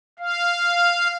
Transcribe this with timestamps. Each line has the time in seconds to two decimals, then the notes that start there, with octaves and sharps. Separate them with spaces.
0.19 F5